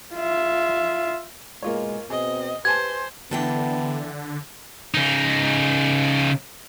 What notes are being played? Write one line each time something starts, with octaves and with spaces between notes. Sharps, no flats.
F4 E5
G#2 B2 G#3 A#3 F4 C#5
B2 C4 G#4 D#5
G4 B4 C5 G#5 A5 G#6
D3 E3 B3 G5 A5
C#3 D#4